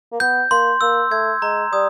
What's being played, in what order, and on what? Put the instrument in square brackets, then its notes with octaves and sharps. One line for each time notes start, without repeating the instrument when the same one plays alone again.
[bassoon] A#3
[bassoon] B3 [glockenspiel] G6
[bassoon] A#3 [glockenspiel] C6
[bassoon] A#3 [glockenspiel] E6
[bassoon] A3 [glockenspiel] G#6
[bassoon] G#3 [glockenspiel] A#5
[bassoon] G3 [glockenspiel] D#6